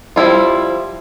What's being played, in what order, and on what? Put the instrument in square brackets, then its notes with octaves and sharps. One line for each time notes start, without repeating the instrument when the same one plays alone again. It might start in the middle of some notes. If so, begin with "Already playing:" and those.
[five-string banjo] F3 G3 E4 F4